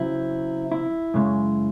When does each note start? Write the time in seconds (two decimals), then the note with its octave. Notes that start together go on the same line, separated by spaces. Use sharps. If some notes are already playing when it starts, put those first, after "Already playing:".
Already playing: C#3 F#3 C4 E4
0.72 E4
1.14 F#2 C#3 G#3